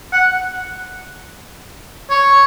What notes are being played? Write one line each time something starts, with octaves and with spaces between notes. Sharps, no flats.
F#5
C#5